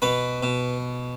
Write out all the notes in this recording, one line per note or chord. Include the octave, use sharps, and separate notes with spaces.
B2 B4
B2